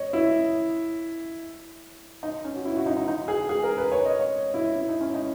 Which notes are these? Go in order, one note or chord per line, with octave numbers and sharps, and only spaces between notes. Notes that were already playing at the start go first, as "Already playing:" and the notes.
Already playing: C#5 D#5
E4
D#4
C#4
F#4
E4
F#4
D#4
D#4
D#4
G#4
G#4
A#4
B4
C#5
D#5
C#5
E4
E4
D#4
C#4
D#4